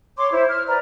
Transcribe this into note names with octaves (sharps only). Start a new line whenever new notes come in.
C#5 C6 D6
E4 C5
F6
B4 D5 A#5